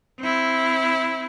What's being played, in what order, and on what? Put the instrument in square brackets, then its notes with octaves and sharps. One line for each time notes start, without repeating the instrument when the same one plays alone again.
[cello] C4 E4